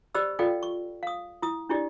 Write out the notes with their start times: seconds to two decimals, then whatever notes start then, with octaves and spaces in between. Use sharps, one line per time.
0.15 G4 C5 D5 D#5 B5 E6
0.39 F4 A4 D5 D#5 F5 G5
0.63 C#6
1.03 F5 D#6
1.42 E4 D#6
1.69 D4 E4 G4 D5 D#5